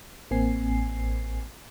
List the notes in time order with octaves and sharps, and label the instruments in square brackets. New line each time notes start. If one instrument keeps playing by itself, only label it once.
[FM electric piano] A1 A#3 C4 G#5 C7